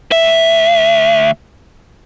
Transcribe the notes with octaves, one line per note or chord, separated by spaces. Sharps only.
D2 E5